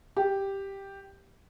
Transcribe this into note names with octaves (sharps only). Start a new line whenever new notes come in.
G4